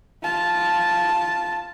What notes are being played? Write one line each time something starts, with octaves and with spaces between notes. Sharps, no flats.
F4 A5